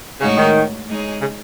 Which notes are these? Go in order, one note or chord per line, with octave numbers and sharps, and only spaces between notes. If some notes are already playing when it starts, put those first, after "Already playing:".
A2 C#3 G#3 D#4 F#4 C#5
D#3
G#3 D#4 G#4 C#5
C#3